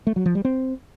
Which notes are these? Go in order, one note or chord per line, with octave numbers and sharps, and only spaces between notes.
A3
F#3
F3
G3
C4